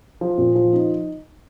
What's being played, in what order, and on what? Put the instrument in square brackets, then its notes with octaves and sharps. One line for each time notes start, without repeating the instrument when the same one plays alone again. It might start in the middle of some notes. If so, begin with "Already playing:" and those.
[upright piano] F3
A#2
F3
D#4